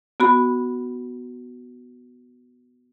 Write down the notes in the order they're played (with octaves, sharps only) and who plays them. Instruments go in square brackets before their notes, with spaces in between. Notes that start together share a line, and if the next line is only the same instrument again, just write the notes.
[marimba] B3 F#4 B5